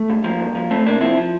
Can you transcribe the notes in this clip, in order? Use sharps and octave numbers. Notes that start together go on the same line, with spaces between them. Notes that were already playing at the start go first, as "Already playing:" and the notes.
Already playing: A3
G2
F3 A#3
G2
F3
F2 A3 C4
C3 A#3 D4
F3 C4 E4
F3